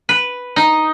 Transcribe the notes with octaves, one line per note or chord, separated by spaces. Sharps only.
B4
D#4